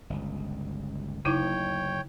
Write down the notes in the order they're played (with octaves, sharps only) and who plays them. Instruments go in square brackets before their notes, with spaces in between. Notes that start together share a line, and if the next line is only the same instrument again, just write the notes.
[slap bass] G1 C#2
[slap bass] F#1 D2 [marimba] C#3 D#4 E4 [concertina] C#5 G5